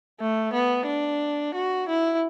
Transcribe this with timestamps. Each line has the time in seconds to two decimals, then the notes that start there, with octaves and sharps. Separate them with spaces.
0.20 A3
0.53 B3
0.86 D4
1.54 F#4
1.88 E4